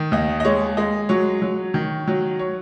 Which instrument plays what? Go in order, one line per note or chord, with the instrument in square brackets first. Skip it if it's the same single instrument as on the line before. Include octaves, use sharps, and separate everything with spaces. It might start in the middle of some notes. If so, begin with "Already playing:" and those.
Already playing: [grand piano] D#3
D#2 D#5
D#5
G#3 C#5
G#3 D#5
F#3 C#5
F#3
D#3
F#3
C#5